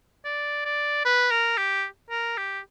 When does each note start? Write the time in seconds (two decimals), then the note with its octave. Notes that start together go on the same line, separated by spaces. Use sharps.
0.25 D5
0.65 D5
1.05 B4
1.31 A#4
1.57 G4
2.11 A#4
2.37 G4